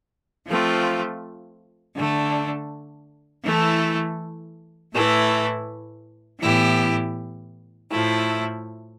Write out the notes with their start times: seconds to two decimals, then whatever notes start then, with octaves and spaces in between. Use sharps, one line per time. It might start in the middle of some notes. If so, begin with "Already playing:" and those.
0.47 F3 A3 C4 F4
1.95 D3 A3 D4
3.44 E3 A3 E4 A4
4.92 A2 E3 A3 E4
6.40 A2 E3 B3 E4 G4
7.89 A2 F3 A3 E4